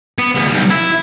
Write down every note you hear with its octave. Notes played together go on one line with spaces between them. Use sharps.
B3
D2 B3
B1 G3
E4